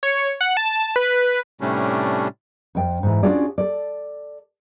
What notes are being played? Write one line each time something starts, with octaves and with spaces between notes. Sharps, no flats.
C#5
F#5
A5
B4
A2 C3 G3 A3 C#4 D4
F2 G5
G#2 E3
C#4 D4 F4 F#4 G#4 D5
A4 D5